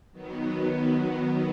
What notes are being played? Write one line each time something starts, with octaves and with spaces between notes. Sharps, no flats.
D#3 F#3 B3